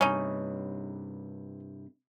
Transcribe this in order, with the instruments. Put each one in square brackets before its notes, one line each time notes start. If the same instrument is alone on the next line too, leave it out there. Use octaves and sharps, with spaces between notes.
[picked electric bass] G2 C3 [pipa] C#4 D#4